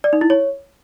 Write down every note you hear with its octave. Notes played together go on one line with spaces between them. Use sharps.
D5
D#4
E4
C#5